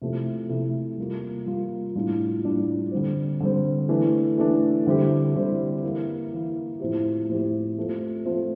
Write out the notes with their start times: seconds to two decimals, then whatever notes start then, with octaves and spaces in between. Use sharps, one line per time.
0.02 C3 F3 A3 E4
0.49 C3 F3 A3 E4
0.98 G3 A#3 F4
1.46 G3 A#3 F4
1.95 A2 G3 D4 F4
2.44 A2 G3 D4 F4
2.92 D3 G3 C4
3.40 D3 G3 C4
3.89 E3 A3 D4
4.38 E3 A3 D4
4.87 D3 G3 C4 E4 G4
5.34 D3 G3 C4 E4 G4
5.83 E3 A#3 E4
6.32 E3 A#3 E4
6.80 A2 F3 C4 E4 G4
7.29 A2 F3 C4 E4 G4
7.77 F3 A3 C4 F4
8.25 F3 A3 C4 F4